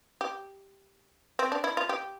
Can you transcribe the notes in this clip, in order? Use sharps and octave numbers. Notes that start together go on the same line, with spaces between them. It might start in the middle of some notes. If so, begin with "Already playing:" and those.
G4
C4
D4
E4
F4
G4